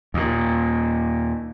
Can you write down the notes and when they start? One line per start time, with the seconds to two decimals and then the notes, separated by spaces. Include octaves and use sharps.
0.14 D#2 A#2